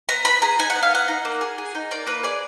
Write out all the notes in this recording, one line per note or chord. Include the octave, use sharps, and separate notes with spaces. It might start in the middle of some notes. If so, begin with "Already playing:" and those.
B3 A#5
B3 B5
G#4 A#5
D#4 G#5
F#5
B3
F5
B3 F#5
D#4
A#3
G#4
G#4
D#4
A#3 D5
A#3 B4
G#4 D5